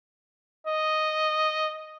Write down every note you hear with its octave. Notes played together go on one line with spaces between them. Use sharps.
D#5